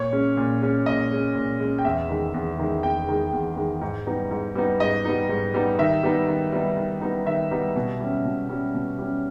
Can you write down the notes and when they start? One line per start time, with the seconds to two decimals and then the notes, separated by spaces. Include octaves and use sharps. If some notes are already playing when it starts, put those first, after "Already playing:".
Already playing: A#2 C#5
0.12 G#3 C#4
0.37 A#2
0.62 G#3 C#4
0.86 A#2 D#5
1.11 G#3 C#4
1.35 A#2
1.60 G#3 C#4
1.78 G5
1.85 E2 E5
2.09 D#3 G#3
2.34 E2
2.59 D#3 G#3
2.83 E2 G5
3.08 D#3 G#3
3.33 E2
3.57 D#3 G#3
3.81 G#2
4.06 G3 B3 D#4
4.31 G#2
4.55 G3 B3 D#4
4.80 G#2 D#5
5.05 G3 B3 D#4
5.29 G#2
5.54 G3 B3 D#4
5.79 D#3 E5
6.03 G3 B3 D#4
6.28 D#3
6.52 G3 B3 D#4
6.77 D#3
7.01 G3 B3 D#4
7.26 D#3 E5
7.51 G3 B3 D#4
7.76 B2
8.00 G3 C#4
8.25 B2
8.49 G3 C#4
8.74 B2
8.99 G3 C#4